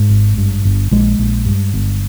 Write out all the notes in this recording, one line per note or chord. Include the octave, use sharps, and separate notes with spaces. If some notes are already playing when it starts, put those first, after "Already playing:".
Already playing: G#2 G#3
G#1
G2
G1
A#1 G#3
A#1
G2
G1